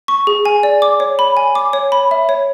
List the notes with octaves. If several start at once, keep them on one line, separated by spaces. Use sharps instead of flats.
C#6
G#4
G#5
D5
D6
C#5
B5
G#5
D6
C#5
B5
E5
C#5